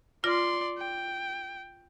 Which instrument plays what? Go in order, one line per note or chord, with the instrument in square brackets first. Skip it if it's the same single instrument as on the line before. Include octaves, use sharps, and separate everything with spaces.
[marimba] F4 F6 A#6 [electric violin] D5 C6
[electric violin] G5